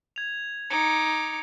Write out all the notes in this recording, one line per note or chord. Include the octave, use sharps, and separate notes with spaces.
G#6 F7
D#4 D6 G#6 C#7